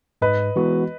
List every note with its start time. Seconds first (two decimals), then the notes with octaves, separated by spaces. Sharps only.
0.22 G#2 B4 D#5
0.56 E3 G#3 B3 F#4